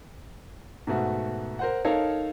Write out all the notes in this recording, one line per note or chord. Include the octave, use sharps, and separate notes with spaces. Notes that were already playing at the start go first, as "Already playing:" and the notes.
G#2 B2 A3 F#4
A#4 C5 F#5
D#4 A4 A#4 C#5 F5